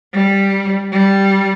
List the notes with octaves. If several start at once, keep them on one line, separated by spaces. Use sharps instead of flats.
G3
G3